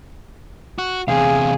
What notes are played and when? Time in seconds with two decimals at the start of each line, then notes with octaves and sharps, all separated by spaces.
0.78 F#4
1.08 E2 C3 G#4 F5